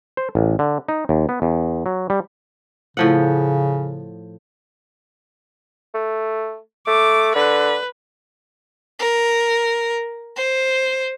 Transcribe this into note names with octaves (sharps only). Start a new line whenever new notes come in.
C5
A1
D3
D#4
D#2
B3
E2
F#3
G3
A2 C#3 F3 F#5
A3
A3 D6
D3 B4
A#4
C5